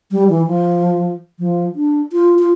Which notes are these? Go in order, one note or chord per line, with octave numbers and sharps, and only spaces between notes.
G3
E3
F3
F3
D4
F4
F4